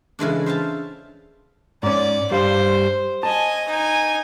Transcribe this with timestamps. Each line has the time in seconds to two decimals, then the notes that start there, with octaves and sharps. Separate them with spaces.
0.19 C#3 E3 G#3 D4
0.46 C5 E5 F5 A5
1.83 G#2 C#4 D5
2.31 G2 G3 C5 F5
3.23 D#5 G#5 A5
3.68 D#4 G#5